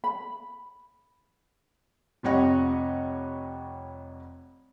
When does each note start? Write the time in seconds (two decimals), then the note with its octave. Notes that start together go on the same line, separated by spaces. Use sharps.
0.04 B5
2.23 F1 F2 G3 C#5 D#5 F#5